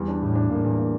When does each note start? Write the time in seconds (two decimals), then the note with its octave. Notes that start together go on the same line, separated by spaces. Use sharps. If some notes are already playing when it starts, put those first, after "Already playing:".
Already playing: E2 G3
0.08 D4
0.21 E2 A2
0.35 D4
0.49 A2 A#3
0.64 E2
0.78 A#3